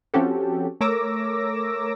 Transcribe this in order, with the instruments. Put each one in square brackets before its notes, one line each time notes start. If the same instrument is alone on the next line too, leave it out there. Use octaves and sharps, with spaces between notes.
[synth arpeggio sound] F3 C4 C#4 F#4 G4 A4
A3 A#4 C#5 D6 E6 A#6